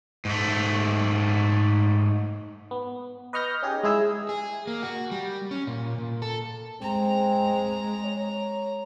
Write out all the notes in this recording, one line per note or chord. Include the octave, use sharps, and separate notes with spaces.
G#2 A3
B3
B4 D#5 C#6 F6 G6 A#6
C#4 D#4 G4 G#4
G#3 E4 G#4 E6
G#4
A#3
F#4
G3
C#4
A#2
A#2
A4
G#3 C4 A#5
C#5